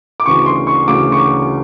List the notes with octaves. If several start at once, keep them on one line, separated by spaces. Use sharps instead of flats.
D6
D2 C#3 E3 C#6
C6
C#6
D2 C#3 E3 D6
C#6
D6